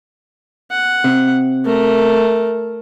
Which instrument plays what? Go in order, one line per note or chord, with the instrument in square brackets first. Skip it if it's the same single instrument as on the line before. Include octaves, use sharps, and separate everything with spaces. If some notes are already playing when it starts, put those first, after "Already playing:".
[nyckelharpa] F#5
[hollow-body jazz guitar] C3
[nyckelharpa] A3 A#4